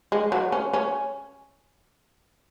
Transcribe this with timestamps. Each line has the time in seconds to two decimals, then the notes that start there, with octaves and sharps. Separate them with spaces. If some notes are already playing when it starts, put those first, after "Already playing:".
0.12 G#3
0.32 F#3
0.52 C#4
0.73 C#4